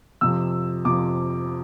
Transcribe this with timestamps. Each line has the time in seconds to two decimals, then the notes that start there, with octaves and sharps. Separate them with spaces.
0.21 F2 C3 F3 E6
0.85 F2 C3 F3 D6